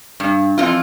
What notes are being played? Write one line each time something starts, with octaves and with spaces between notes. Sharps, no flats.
G2
F2 E3 F4